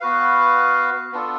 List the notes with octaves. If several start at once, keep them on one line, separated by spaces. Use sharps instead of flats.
B3 F#4 B4 F5
B3 D4 F4 A4